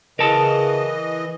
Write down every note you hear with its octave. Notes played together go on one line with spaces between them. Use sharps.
C#3 E3 A#4 D#5 A5